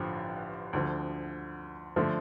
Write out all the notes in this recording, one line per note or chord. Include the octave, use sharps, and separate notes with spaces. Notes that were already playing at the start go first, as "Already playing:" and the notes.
Already playing: A1 G2 D3 F3
D2 D3 F3
D3 F3 A3